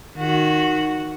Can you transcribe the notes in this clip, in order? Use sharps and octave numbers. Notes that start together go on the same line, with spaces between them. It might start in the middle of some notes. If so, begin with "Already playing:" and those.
D#3 F#4